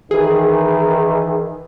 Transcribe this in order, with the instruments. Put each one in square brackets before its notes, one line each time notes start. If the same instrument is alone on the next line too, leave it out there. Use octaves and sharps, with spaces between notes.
[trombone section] D#3 E3 [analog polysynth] G#4